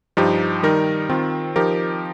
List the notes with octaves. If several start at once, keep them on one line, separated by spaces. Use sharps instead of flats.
G2 F3 D#4 G4
D#3 G3 D#4 A#4
D#3 C4 F4
F3 D#4 G4 A#4